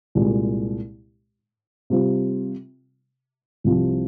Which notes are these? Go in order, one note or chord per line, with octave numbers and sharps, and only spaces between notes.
C2 A#2 G#3
C3 G3 C4 F4
C2 C3 F3